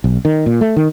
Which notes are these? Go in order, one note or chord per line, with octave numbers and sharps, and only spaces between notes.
B1
D#3
A#2
A3
D#3